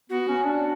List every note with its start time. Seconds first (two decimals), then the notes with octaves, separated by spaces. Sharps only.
0.10 B3 F#4
0.28 C#4
0.44 D4